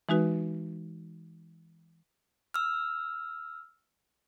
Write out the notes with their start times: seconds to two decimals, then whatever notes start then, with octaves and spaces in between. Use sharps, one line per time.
0.09 E3 G#3 D#4 F#4 B4
2.54 E6 F6